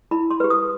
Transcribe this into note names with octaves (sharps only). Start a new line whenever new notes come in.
E4 B5
C6
G4 B4
D#6